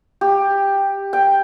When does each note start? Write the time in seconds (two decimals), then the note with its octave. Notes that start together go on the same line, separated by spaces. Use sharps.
0.21 G4
1.13 G5